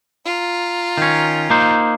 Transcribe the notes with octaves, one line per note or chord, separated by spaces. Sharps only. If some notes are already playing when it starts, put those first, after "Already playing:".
F4 A#5
D#3 C#4
A#3 D#4 C5